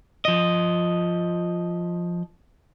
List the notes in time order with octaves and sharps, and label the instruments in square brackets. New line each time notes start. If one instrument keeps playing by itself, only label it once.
[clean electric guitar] F3 D#5